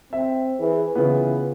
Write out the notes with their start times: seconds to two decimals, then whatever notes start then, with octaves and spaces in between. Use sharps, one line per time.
0.13 C4 E5
0.60 E3 G#4
0.95 C#3 E3 B3 F4